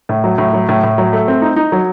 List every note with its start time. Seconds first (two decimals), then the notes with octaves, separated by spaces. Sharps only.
0.09 A2
0.24 F#3
0.38 A2
0.53 F#3
0.69 A2
0.83 A2
0.98 F#3
1.13 A3
1.28 C4
1.42 D#4
1.56 D#4
1.72 F#3